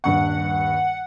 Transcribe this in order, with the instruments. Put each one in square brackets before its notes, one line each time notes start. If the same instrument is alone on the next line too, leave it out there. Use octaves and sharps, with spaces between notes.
[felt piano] D#1 G2 C#6 [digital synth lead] F#5